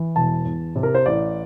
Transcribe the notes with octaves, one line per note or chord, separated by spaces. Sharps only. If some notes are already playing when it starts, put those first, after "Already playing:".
Already playing: E3
E1 A5
E2
C3
A#4
C5
A1 D5